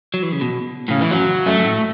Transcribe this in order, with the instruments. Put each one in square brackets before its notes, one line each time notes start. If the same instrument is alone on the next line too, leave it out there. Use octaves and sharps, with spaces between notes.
[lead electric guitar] F#3
E3
C#3
B2
[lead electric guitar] A2 [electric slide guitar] C#3
[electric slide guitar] E3
[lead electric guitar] F#2 [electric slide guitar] F#3
[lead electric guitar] F#2 [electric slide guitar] A3
[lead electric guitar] F#2
A2